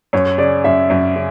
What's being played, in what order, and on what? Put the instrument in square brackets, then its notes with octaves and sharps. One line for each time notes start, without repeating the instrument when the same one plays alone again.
[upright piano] F#2 [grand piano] C#5
[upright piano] C#3 [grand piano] D5
[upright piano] F#2 [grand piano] E5
[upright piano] F#2
C#3